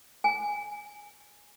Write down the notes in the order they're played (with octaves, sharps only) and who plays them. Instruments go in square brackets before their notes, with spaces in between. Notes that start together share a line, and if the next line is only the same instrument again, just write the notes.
[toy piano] G#5